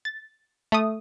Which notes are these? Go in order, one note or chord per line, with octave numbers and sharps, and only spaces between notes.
A6
A3 D#6